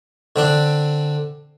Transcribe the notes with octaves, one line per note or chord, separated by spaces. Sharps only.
D3 C4 D4